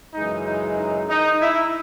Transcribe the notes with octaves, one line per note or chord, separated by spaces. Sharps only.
F#2 C#3 E3 G#3 D#4
D#4
D#4
D#4
E4